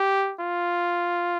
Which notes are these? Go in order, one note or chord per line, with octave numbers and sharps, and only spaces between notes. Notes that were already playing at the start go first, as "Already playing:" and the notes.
Already playing: G4
F4